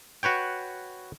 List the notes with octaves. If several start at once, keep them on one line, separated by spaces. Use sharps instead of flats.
F#4 B4 C#5 G5